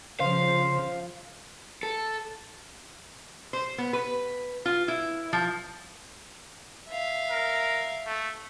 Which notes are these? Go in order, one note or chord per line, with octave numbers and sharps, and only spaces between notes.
C#3 F3 C5 F5
A4
C5
B3
B4
F4
E4
F3
E5 F5
A#4
A3